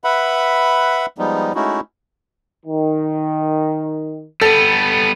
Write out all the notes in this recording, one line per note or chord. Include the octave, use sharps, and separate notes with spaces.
B4 E5 F#5 B5
F3 G3 G#3 B3 D#4
G#3 A3 C#4 D#4 E4 F#4
D#3
G3 B3 A4